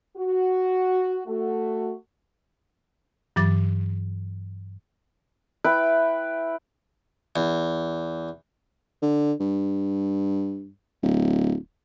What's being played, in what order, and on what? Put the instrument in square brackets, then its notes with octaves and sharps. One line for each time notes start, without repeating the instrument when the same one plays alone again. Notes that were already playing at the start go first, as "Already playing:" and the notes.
[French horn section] F#4
A3 F#4
[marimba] G2 E3 F#3 D6 A6
[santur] E4 B4 G5
[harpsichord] E2
[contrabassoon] D3
G2
D1